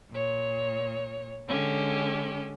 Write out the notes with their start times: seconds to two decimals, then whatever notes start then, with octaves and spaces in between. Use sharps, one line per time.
0.13 A#2 C#5
1.49 D3 G#3 C#4 G4 A4